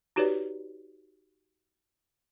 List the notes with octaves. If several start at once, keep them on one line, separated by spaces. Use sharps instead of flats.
D#4 F#4 G4 B4 C#5 D5